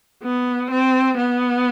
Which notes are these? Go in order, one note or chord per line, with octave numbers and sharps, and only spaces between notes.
B3
C4
B3